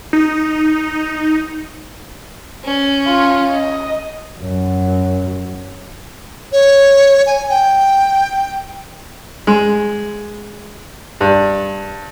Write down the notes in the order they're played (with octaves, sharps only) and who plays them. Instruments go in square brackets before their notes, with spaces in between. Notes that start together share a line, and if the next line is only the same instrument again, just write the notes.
[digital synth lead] D#4
[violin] C#4
[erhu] F4
D#5
[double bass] F#2 F#3
[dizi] C#5
G#5
G5
[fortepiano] G#3
G2